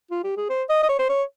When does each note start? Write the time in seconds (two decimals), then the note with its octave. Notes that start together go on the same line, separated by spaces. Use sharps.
0.11 F4
0.24 G4
0.37 G#4
0.49 C5
0.69 D#5
0.83 D#5
0.89 C#5
0.99 C5
1.09 C#5